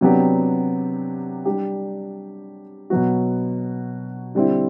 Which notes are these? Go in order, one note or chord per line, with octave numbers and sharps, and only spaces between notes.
C3 F#3 B3 D4 G4
G3 D4 G4
B2 F#3 B3 F#4
D3 G3 C4 E4